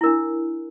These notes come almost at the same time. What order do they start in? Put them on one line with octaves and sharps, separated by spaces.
E4 A#4 D4